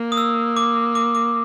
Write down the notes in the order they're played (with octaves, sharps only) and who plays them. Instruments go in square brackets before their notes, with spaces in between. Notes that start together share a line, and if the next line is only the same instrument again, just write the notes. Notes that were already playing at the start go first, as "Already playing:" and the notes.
Already playing: [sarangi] A#3
[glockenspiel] D#6
E6
D6
D6
D6